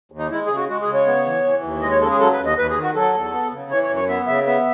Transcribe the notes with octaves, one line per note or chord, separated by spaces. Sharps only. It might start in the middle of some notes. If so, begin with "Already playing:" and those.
D#2
D#4
G#3 E4
C#3 G#4
F#4
G#3 F#4
G#4
C#3
C#5
B3
E3
E3
D#2
G#3 D#5
C#5
C#3 A4
G#4
F#3 A4
B4
D#2
D#5
D#2 B4
G#4
D#3
F#4
F#3 A4
E2
B3
C#3
E3 C#5
C#5
F#2
C#5
B3 E5
C#3 E5
B3 E5